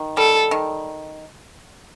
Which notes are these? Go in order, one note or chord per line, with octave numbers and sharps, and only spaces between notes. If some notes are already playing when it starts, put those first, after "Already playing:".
Already playing: D#3
G3 A4
D#3